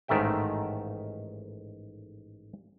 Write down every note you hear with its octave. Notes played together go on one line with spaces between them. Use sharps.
A1 G#2 D#3 A3 E5 G5